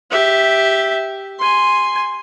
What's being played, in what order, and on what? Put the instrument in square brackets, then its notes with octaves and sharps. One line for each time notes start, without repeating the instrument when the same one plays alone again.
[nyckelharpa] G4 E5
G#5 C6